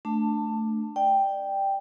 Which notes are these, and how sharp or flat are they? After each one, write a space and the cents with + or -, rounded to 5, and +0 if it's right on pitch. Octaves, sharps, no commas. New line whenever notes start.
A3 +0 D4 +5 A5 +15
D5 +20 G5 +0